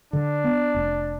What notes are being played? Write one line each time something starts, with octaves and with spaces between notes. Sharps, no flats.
D3 D4
B3
F1